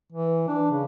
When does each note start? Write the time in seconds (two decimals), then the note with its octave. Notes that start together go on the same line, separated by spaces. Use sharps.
0.12 E3
0.48 D4
0.71 C#3